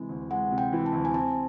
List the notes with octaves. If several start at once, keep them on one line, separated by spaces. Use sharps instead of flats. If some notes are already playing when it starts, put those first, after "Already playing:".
Already playing: C3 E3 G#3
D2
G#3 F#5
C3
G5
E3
A5
D2
G#5
C4 A5